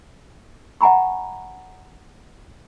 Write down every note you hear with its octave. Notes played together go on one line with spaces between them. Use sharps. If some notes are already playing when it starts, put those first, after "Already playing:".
D#5 F#5 G#5 A#5 B5 C#6